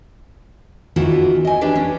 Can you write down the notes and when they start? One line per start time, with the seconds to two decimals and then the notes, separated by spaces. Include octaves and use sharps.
0.96 D#3 E3 B3 F4 F#4
1.45 D#5 G#5
1.61 D4 G4 B4 C#5
1.75 C#4